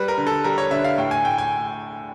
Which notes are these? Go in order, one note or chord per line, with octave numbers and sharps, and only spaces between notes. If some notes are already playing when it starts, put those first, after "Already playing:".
Already playing: G3 B4
A#4
D3
A4
G3 A#4
C#5
D3 E5
F5
A2 G5
G#5
A2 G5
G#5